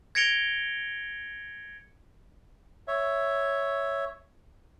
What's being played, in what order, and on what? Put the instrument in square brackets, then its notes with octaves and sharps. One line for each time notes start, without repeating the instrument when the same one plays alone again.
[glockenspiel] G#6 A#6 C#7 D7 F7 G7
[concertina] C#5 E5